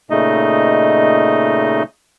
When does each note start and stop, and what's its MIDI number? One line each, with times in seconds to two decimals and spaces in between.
0.10 1.83 46
0.10 1.83 49
0.10 1.83 57
0.10 1.83 63
0.10 1.83 75